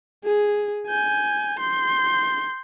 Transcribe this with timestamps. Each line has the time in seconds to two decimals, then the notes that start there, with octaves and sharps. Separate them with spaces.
0.24 G#4
0.88 G#5 G6
1.60 C6 G6